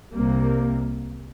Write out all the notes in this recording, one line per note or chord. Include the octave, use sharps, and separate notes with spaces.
C2 C3 G3 A#3